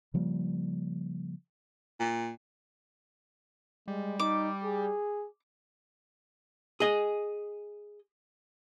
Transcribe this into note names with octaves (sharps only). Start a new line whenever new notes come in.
C#3 F3 G3 A#3
A#2
G3 G#3
D#4 D6
G#4
G#4 D#5